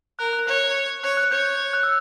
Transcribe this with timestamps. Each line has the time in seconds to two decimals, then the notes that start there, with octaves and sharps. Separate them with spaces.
0.19 A#4 F#6
0.33 F#6
0.47 C#5 F#6
1.03 C#5 F#6
1.17 F#6
1.31 C#5 G6
1.73 F#6
1.83 E6